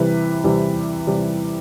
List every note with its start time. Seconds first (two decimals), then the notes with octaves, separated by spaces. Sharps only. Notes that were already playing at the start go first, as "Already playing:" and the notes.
Already playing: C3 E3 G3 B4
0.44 C3 E3 G3
1.07 C3 E3 G3